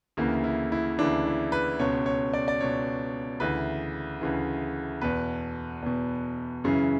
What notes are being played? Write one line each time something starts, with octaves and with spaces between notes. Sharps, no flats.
D2 C#3 E3 A#3
E4
E4
D2 C#3 E3 D4
E4
B4
C#2 B2 C#5
C#5
D5
D5
C#2 B2 C#5
D2 C#3 E3 B4
D2 C#3 E3
E2 B2 B4
E2 B2
F#2 C#3 E3